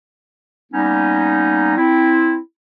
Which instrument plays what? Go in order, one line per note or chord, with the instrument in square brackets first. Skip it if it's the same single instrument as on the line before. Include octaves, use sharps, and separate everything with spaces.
[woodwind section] G3 A#3 B3 C#4 D#4
C4 E4